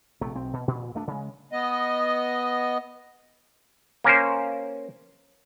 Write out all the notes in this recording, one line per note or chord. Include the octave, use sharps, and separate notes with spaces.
A#1 C3 A3
B1 C4
B2
A#2
D#1 A3 D4
C#3 G#3
B3 D#5
A#3 C#4 A#4 C5